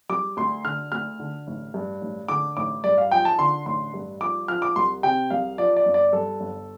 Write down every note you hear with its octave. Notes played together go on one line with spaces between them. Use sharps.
G3 D6
D2 C6
D3 F6
D2 F6
D3
A1
G2
A1
D3 D6
A1 D6
G2 D5
F5
F3 G5
A5
D3 C6
A1 C6
G2
F3 D6
F3 F6
D6
C2 C6
C3 G5
C2 F5
F3 D5
D5
G1
D5
G2 A4
G1